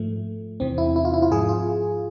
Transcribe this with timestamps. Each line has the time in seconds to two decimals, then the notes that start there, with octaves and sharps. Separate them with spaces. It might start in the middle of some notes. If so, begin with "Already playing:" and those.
Already playing: G#2 F3 A3
0.60 E2 C3 E3 C4
0.78 E4
0.96 E4
1.05 F4
1.14 E4
1.22 F4
1.31 G#2 F3 G#4
1.49 F4